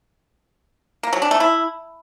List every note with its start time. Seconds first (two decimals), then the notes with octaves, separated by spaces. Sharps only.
1.03 A#3
1.13 F#3
1.22 D4
1.31 A3
1.40 E4